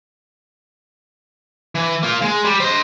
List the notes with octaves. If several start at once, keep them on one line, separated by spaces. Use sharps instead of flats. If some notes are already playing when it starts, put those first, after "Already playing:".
E3
A#3 F4
G#3
G3
C5 D#5